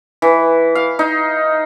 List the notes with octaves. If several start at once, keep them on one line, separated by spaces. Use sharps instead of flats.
E3
F5
D#4